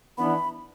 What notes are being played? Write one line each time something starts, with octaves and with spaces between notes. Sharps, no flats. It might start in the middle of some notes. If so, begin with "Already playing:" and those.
E3 B3 D4 B5